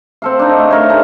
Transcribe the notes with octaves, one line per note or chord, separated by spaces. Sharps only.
C4 A4 F5
D4 D#4
A3
A3 A#4 C#5
D#4 G#4 A5